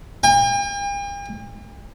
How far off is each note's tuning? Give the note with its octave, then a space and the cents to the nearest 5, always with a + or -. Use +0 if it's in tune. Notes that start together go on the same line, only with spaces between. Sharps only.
G5 +45